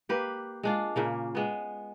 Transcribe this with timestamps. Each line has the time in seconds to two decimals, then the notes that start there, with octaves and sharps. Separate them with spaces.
0.09 A#3 G4 B4
0.63 G#3 D4 F4
0.96 A#2 C#3 A#3
1.35 G#3 B3